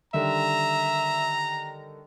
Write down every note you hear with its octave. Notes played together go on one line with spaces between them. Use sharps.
D3 D#3 G3 E5 A#5